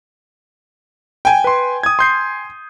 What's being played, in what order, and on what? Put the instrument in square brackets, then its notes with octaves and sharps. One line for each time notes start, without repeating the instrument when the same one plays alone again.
[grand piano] G5 G#5
[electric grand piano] B4 C6
D#6 G#6
C6 G6 C7